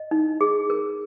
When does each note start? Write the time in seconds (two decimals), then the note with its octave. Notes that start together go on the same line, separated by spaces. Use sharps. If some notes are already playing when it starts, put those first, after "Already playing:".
Already playing: D#5
0.11 D#4
0.41 G#4
0.70 A#4